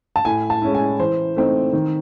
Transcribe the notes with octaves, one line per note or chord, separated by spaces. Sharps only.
A5
A2 G#5
A5
G#3 C#4 E4
G#5
E3 C5
A3 C4 D#4
D#3